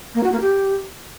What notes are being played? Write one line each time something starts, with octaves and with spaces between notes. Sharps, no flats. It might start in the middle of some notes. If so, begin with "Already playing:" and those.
A#3
F#4
A#3
G4